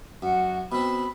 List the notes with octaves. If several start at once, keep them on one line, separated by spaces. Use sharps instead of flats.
F#2 F#4 F#5
B2 C4 B5